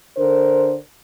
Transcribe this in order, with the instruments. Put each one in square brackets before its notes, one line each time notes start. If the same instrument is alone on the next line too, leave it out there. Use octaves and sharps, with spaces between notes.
[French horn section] D3 D4 A#4 C5